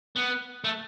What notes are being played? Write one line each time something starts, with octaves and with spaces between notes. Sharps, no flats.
B3
A3